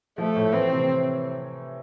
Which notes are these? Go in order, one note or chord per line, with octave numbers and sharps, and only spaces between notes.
F3 A3
A2
E3 C4
C3